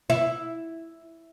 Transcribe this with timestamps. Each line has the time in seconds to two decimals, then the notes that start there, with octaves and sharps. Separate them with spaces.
0.10 E4